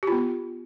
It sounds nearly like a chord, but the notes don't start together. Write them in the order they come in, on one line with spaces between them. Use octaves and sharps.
G4 F4 B3